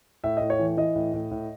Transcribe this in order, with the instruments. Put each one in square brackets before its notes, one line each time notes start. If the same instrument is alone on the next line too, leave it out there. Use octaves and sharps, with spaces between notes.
[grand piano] A2 E5
A2 D#5
C#5
E3
E3 D#5
A2
A2
A2